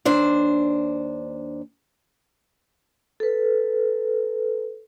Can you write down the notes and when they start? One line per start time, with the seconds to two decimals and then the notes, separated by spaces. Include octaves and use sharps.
0.05 D#2 D4 C5
3.20 A4 B4